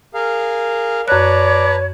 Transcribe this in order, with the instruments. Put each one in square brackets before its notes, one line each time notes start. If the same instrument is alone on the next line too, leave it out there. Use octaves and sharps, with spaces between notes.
[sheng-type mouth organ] G#4 A#4 F5
[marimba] F#2 F#6 [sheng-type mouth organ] B4 A5 A#5 [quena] C#5 [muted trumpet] D5